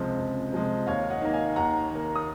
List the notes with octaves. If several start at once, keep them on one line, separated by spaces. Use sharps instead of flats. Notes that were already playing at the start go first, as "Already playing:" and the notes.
Already playing: C#2 C3 F3 G#3
C#2
C3 F3 G#3
D#2 C#5 F5
D#5 F#5
D#3 A#3
F5 G#5
D#2 F#5 A#5
D#3 A#3
D#6